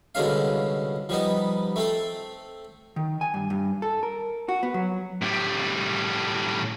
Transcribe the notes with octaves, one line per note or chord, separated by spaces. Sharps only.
C2 B2 D3 G#3 C#4 F5
F3 G3 B3 D#4
A3 C4 A4
D#3
G#5
G2
G2
A4
A#4
F#4
B3
F#3
A2 G3